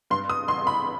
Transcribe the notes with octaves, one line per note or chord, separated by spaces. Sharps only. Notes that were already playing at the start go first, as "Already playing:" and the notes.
G2 C6
D#6
A1 C6
B5